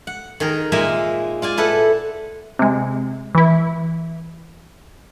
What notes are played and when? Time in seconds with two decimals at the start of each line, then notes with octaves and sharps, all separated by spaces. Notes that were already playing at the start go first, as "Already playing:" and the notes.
0.07 F#5
0.40 D#3 G#4 A#4
0.72 A#2 G#3 A#4 E5 G#5
1.42 F4 D5 G#5
1.57 E4 A4 B4 F#5
2.59 C3 G#3
3.35 E3 E4